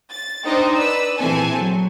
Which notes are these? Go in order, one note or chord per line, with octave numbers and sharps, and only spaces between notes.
A6
D4 D#4 C5 D#5 G5
B4 D5 E6
A#1 E3 C4 A4 G#5 A5
F#3